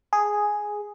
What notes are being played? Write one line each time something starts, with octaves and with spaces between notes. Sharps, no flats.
G#4